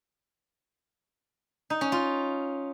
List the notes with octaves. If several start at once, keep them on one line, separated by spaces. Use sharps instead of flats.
D#4
C#4
F4